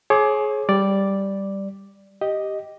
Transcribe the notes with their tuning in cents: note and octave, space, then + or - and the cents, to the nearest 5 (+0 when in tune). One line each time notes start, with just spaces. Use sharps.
G#4 +25 C#5 -30 D6 +0
G3 +0 D5 +0
G4 -5 D#5 +0